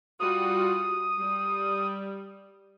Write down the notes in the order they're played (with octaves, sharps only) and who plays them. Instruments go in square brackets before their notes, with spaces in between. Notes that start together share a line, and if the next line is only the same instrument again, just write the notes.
[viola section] G3 F4 F#4 [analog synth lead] D#6
[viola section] G3